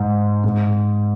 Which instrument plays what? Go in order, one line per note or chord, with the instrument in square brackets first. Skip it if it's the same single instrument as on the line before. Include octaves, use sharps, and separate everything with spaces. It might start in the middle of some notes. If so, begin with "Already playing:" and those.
Already playing: [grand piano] G#2
G#2